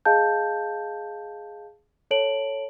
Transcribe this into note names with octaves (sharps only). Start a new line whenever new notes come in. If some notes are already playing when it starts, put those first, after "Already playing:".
G#4 D#5 F5 A5 G6
A4 C#5 A5 D7 F#7